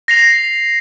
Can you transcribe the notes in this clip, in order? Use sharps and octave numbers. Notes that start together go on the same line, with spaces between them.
A#6 C7 F7